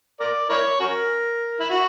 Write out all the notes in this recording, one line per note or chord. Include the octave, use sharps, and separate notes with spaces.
A#4 D5
E4 A#4 C#5
C#4 F#4 A#4
E4
F#4